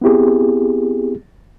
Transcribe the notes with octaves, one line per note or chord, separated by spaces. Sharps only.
B3 C4 E4 G4 G#4